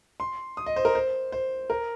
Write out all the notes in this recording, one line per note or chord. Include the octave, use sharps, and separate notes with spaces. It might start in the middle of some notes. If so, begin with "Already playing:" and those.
C6
D#6
D#5
C5
A#4
C5
C5
A#4